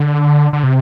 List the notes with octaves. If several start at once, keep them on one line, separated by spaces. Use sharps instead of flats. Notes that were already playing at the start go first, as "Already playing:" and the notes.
Already playing: D3
D3
C3